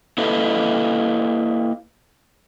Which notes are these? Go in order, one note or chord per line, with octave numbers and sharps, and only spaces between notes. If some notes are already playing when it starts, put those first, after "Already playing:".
A#3 E4 A4 B4 D#5 F5